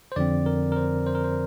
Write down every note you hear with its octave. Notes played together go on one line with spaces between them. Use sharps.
C5
F2 D3 F3 C4 D5
A#4
A#4
C5
C5
A#4
C5